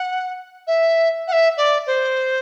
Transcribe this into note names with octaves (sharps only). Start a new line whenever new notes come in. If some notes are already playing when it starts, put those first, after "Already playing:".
Already playing: F#5
E5
F#5
E5
D5
C5